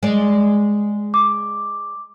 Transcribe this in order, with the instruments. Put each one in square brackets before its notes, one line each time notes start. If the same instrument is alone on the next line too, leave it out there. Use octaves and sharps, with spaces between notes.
[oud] G#3 D5
[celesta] D6